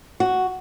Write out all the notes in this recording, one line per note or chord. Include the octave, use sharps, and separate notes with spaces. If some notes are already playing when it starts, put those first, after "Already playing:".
F#4